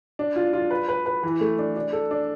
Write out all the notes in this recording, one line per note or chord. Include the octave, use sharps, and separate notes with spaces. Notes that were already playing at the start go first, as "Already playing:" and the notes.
D4
F4
F4
B4
B4
B4
E3
A3
D4
D4
A4
D4